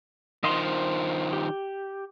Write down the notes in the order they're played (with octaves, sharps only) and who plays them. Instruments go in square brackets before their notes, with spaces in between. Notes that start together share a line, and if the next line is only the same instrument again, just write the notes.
[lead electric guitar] D#3 F3 [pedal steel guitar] D#5 F5 C6
[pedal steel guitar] C5
G4